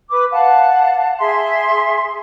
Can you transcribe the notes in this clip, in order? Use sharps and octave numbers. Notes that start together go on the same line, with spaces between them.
B4 D6
F5 F#5 A5
G#4 E5 C6